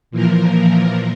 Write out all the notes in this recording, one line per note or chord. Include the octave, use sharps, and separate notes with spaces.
A#2 E3 F3 A#4